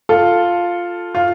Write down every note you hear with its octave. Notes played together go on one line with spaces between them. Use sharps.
F4 A4
F4